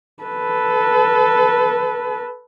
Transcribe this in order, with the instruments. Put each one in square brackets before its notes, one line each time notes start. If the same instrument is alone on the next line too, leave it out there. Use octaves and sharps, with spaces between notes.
[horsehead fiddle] A4 B4